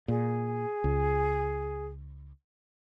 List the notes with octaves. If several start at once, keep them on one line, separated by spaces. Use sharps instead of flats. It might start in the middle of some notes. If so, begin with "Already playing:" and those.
A#2 G#4
C#2